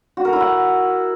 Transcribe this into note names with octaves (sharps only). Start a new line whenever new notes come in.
F#4
A#4
E4
F#5